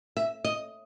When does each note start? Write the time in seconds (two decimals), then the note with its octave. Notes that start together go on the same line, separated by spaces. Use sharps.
0.17 E5
0.44 D#5